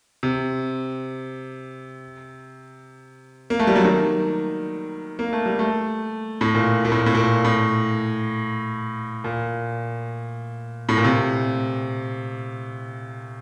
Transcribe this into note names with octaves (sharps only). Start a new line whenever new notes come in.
C3
A#3
A3
G3
F#3
D#3
A#3
A3
G3
A3
A2
A#2
A#2
A2
A2
A#2
A2
A#2
A2
A#2
C3